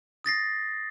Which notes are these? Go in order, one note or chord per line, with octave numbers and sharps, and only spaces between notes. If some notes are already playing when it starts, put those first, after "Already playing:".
D#6 A6 A#6 C7